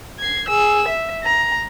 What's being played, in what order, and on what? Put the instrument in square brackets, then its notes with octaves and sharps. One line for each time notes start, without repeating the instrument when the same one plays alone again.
[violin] G#6 C7
G#4 E6
E5
A#5